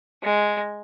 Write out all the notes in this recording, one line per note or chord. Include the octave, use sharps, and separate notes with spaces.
G#3